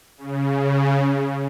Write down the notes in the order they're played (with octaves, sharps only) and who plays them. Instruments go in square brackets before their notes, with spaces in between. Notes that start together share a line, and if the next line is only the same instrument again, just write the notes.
[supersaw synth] C#3